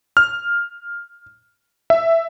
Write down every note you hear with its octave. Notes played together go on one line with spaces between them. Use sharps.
F6
E5